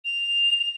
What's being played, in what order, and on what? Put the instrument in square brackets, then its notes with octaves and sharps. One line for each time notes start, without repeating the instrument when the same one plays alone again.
[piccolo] F7